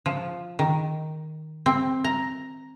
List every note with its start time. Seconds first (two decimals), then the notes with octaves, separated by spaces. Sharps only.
0.06 F3
0.59 D#3
1.66 C4
2.04 A#5